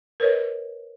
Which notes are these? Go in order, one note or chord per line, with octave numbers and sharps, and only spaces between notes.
A#4 B4 C#5 D#5